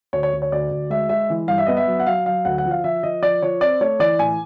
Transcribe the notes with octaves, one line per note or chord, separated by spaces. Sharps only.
D2 C#5
C#5
D2
C#5
D2 D5
D2
G#3 E5
G#3 E5
E3
G2 F5
E5
B3 D#5
E5
F#3
F#5
F#3 F5
F#3 F5
D2 F#5
F#5
F3
F5
F3 E5
F3 D#5
F3 D5
F3 C#5
C4 D5
A3 C#5
E3 D5
A2 G#5